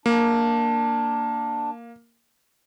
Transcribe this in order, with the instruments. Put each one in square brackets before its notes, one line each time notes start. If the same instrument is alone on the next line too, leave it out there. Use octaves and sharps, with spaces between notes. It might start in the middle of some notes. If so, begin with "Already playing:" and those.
[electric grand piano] A#3 [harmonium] D4